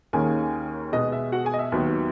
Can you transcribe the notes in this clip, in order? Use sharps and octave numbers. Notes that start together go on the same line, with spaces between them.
D#2 D#3 A#3 C#4 G#4 G#5
B2 G#3 B3 D#5
E5
F#4 F#5
G#4 G#5
D#5
E5
D#2 D#3 F#3 B3